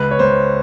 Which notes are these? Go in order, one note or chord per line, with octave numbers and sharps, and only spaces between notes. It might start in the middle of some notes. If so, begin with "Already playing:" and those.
Already playing: C#2 B4
C#5
C#2 C5